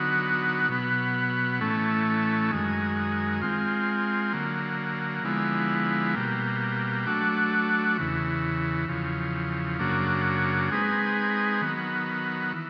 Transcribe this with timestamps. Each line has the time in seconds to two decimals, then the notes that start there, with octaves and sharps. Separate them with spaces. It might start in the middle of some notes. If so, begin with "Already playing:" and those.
Already playing: D3 F#3 B3 D#4 F#4
0.69 B2 F#3 B3
1.60 A2 E3 A3 C#4
2.51 F#2 D#3 G#3
3.42 G#3 C4 F4
4.33 D3 F#3 A#3
5.24 D3 F3 G#3 B3 E4
6.15 B2 G3 A#3
7.06 F#3 A3 D4 F#4
7.97 E2 C#3 E3
8.88 E2 C#3 F3
9.79 F#2 C#3 F#3 A#3 D4
10.70 G#3 C4 D#4 G#4 B4
11.62 D#3 F#3 B3
12.53 E3